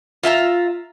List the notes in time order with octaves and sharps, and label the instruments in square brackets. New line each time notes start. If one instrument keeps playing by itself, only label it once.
[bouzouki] F4 E5 G#5 A#5